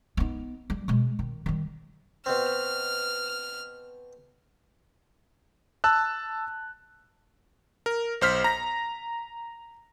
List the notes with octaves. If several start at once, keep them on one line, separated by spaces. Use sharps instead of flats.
B3 D#4
G3
B2 G#3
D#3
D#3 G3
B2 C4 F6
A5 E6 F#6
A#4
B1 C5 F6 B6
A#5 A#6